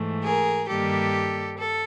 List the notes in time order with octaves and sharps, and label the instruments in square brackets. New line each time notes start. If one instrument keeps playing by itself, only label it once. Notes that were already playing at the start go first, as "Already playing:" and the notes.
Already playing: [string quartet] G#2 E3 A3
G#4 A#4
G2 D#3 G3 A#3 G4 A4
A4